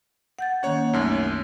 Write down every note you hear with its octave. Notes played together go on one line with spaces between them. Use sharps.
F#5 G6 A6
D#3 A#3 C#4 C#5 F#5
C2 F#2 A3 D#4